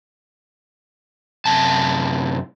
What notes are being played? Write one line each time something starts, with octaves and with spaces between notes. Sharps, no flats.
F#2 C3 A5